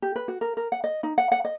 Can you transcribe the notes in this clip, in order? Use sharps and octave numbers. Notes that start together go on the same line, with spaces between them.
G4
B4
F#4
A#4
A#4
F#5
D#5
D#4
F#5
F#5
D#5